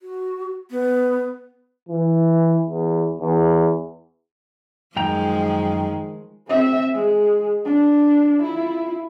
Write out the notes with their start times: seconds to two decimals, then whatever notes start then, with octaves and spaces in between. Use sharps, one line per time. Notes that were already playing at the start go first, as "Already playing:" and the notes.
0.02 F#4
0.71 B3
1.89 E3
2.67 E2
3.21 E2
4.96 F#2 D#3 F3 G#3 G5 A#5
6.47 C4 E5
6.93 G#3
7.65 D4
8.43 E4 F4